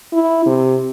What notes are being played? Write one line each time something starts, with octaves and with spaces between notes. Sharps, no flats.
E4
C3